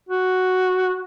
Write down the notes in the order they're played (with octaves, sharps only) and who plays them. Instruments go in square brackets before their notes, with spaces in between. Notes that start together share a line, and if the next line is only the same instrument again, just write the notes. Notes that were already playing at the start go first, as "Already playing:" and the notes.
[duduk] F#4